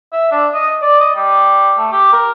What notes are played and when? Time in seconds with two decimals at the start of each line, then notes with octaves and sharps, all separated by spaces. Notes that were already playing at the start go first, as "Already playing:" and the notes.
0.12 E5
0.31 D4
0.54 D#5
0.82 D5
1.00 D#5
1.16 G3
1.77 A3
1.92 G4
2.13 A#4